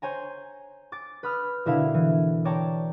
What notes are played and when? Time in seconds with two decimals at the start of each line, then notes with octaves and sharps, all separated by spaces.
0.02 C5 C#5 G#5 A#5
0.92 D6 A6
1.23 B4 B5 D#6 F6
1.66 B2 D3 E4 A#4 F5 G#6
1.94 E3
2.45 C#5 D5 G5 A5 A#5 D6